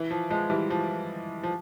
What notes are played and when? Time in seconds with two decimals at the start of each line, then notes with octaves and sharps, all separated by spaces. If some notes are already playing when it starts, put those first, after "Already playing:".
Already playing: E3
0.11 F3
0.30 F3 G#3
0.50 E3 G3
0.70 F3
1.43 F3